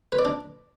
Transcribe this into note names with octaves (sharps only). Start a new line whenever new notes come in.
B4
D5
D4